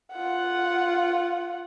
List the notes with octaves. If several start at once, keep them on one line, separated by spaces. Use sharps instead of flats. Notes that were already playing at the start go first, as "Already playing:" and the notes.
F4 F#5